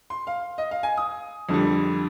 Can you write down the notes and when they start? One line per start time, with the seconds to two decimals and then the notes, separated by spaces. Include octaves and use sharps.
0.10 C6
0.27 F5
0.58 D#5
0.71 F5
0.83 G#5
0.97 D#6
1.49 F2 D3 G3